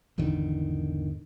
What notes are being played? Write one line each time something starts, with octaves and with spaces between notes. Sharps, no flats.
G#1 E2 D3 D#3